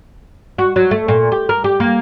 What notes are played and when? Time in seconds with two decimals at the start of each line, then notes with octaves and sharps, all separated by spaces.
0.58 F#4
0.76 F#3
0.91 A3
1.08 A#2
1.32 G4
1.49 A#4
1.64 G4
1.80 A#3